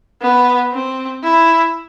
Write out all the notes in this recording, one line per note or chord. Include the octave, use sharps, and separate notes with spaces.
B3
C4
E4